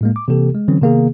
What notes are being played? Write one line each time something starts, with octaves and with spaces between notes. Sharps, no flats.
A2 G#3 A#3
D6
C3 E3 A#3 G4 A4
G#3
D3 E3 F#3 C4 C#4
C3 D#3 A#3 B3 G#4